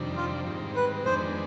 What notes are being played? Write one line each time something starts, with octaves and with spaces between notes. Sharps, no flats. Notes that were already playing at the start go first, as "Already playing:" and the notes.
Already playing: F2 C3 D#3 G3 D4
F4
G#2 D#3 G3 C4
B4
F2 D#3 G#3 B3 D4 C5